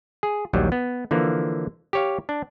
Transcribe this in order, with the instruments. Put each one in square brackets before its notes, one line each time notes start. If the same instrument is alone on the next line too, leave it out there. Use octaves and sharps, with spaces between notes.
[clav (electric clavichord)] G#4
A#1 D#2 F#3 G3
B3
D3 E3 F3 A#3
G4 C#5 F5
D4